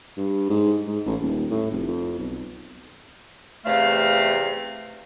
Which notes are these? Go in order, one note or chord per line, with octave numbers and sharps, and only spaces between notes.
G2
G#2
G#2
A1
D#1
A2
F1
F2
B1
E2 C3 A3 F5